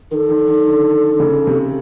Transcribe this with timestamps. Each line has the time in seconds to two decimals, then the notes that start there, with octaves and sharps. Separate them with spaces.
0.11 D#3 A4 A#4
0.29 D#3
0.47 D#3
0.65 D3
1.10 D3
1.20 C#3
1.47 C3